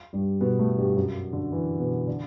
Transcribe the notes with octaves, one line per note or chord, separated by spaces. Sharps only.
G2 G3
B2 B3
A2 A3
G2 G3
F#2 F#3
D3
E3
B2 B3
D3 D4